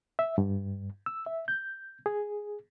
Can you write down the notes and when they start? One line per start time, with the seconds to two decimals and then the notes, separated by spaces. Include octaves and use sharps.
0.19 E5
0.38 G2
1.06 E6
1.26 E5
1.48 G6
2.06 G#4